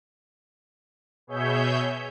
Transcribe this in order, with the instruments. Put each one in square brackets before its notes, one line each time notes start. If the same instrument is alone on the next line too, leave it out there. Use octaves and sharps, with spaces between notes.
[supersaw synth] B2 G#4 C#5 E5 G6